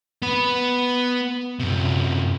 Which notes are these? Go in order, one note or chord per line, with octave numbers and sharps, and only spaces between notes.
B3 B4
F#2 C3